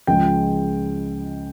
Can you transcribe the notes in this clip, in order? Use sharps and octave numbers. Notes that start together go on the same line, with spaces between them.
C#2 C#3 F3 G#3 G5